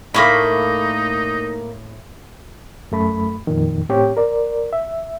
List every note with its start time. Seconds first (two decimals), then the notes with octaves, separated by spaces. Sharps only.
0.14 A2 A3 A#3 C#4 D#4 B5
2.92 F#2 A3 B5
3.47 F2 A#2 D#3
3.89 A2 C4 G4 C#5
4.17 A#4 D5
4.73 E5